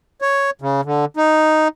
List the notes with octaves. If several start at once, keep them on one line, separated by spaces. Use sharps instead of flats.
C#5
C#3
D3
D#4